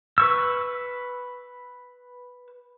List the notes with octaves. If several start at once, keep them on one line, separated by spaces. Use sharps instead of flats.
B4 C#6 E6